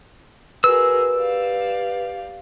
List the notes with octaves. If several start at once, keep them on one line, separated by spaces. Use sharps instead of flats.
F#4 G#4 A#4 B4 E6
G4 D5 F5